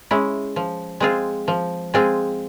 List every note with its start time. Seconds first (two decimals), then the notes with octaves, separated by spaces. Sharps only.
0.11 G#3 C#4 E4
0.56 F3
1.00 G#3 C4 F4 G#4
1.48 F3
1.94 G#3 C4 F4 G#4